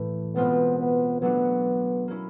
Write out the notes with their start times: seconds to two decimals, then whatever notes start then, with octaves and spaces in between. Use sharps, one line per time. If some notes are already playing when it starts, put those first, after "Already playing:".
Already playing: A2 E3 A3
0.35 B2 G#3 B3 C4 F4
0.79 B3
1.21 F#3 A3 B3 D4 F#4
2.08 A#3 C#4 E4